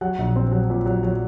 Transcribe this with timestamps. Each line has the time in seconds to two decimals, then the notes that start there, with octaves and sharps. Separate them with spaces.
0.01 F#3 F#5
0.18 A#1
0.36 C4
0.52 F#3
0.70 A#2
0.86 F#3
1.03 F#3